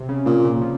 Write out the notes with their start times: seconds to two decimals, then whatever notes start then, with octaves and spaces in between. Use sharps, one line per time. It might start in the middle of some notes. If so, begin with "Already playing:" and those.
Already playing: C3
0.09 C#3
0.26 A#2 C#3
0.45 C#3
0.61 F3